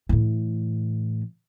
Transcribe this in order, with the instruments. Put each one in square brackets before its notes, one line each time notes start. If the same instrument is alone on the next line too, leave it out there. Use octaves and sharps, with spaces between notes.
[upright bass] A2 E3